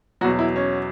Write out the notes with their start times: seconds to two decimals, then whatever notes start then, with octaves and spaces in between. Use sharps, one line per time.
0.21 E2 B2 F#3 F#4
0.39 E4
0.56 C#4